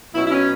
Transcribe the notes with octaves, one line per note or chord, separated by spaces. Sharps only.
B2 F#3 C#4 E4
E4
C#4